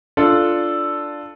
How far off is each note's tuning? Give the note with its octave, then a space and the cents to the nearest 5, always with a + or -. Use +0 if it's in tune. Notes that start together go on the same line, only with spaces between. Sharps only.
D4 +0 F4 -10 A4 +0